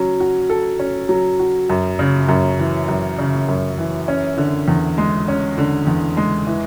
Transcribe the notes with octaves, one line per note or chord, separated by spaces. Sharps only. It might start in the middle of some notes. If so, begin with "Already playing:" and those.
Already playing: F#3 C#4
F#4
A4
C#4
F#3
F#4
F#2
C#3
F#2
E3
F#2
C#3
F#2
E3
C#4
D3
E2
G#3
C#4
D3
E2
G#3
E3